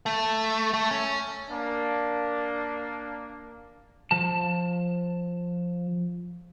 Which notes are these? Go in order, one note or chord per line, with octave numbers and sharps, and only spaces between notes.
A3
A3
C#4
A#3 D4
F3 A5